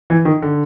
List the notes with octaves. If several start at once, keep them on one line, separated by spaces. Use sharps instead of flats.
E3
D#3
D3